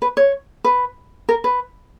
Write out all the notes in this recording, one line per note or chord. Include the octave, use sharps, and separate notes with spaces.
B4
C#5
B4
A#4
B4